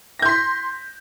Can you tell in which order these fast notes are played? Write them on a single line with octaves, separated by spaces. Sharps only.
A#6 G6 C6 B6